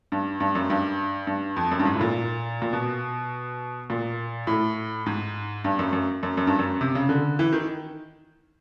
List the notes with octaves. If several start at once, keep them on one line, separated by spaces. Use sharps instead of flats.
G2
G2
F#2
G2
G2
F2
F#2
G2
G#2
A2
A#2
A#2
B2
A#2
A2
G#2
G2
F#2
F#2
F#2
F#2
G2
F#2
C3
C#3
D3
E3
D#3